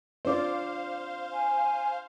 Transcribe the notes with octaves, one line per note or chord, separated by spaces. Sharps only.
C4 D4 F4 C5 D5 F5
G#5